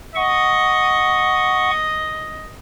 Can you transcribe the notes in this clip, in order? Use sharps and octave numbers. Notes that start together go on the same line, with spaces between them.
D#5 F#5 C#6